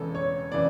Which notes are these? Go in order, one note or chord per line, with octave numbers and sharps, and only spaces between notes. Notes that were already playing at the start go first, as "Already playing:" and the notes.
Already playing: E1 E2 C#3 E3 A4
C#5
C#3 E3 D5